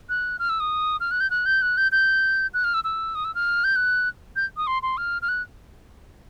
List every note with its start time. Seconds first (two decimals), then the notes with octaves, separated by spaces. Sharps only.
0.09 F#6
0.39 F6
0.49 E6
0.60 D#6
1.00 F6
1.11 F#6
1.20 G6
1.30 F#6
1.46 G6
1.62 F#6
1.77 G6
1.92 G6
2.54 F#6
2.64 F6
2.74 E6
2.84 E6
3.15 D#6
3.24 E6
3.35 F6
3.64 G6
3.76 F#6
4.36 G6
4.57 D#6
4.67 C6
4.82 C6
4.97 F6
5.22 F6
5.28 F#6